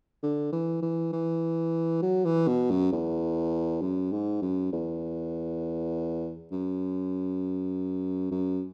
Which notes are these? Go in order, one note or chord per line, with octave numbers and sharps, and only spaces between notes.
D3
E3
E3
E3
F#3
E3
B2
F#2
E2
F#2
G#2
F#2
E2
F#2
F#2